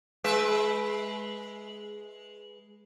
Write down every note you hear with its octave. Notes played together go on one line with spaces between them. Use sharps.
G#3 B4 E5